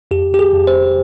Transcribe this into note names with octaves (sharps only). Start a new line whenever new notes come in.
F2 G4
G4
G#4
F2
C5